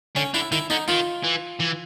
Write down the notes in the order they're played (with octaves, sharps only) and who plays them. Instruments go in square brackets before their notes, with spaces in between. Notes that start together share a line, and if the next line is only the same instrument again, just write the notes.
[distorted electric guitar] D3 [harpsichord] C#4
[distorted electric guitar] D3 [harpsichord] E4
[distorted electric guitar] D#3 [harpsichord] E4
[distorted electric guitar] D3 [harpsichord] D#4
[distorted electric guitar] D#3 [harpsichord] F4
[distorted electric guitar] E3
E3